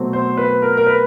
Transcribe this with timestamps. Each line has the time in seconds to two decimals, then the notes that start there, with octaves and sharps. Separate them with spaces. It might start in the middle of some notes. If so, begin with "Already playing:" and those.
Already playing: B2 F#3 A3 C4
0.13 C5
0.37 B4
0.62 A#4
0.77 A#4
0.86 B4